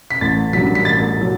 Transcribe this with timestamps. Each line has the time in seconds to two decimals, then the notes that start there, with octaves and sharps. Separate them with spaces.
0.10 B6
0.21 A1 A6
0.53 G2 F#3 B6
0.75 B6
0.85 A1 A6
1.21 F#3